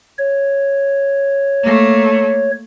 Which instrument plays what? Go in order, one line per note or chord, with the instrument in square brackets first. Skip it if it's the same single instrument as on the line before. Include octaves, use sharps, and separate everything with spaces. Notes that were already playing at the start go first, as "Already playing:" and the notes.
[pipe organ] C#5
[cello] A3 A#3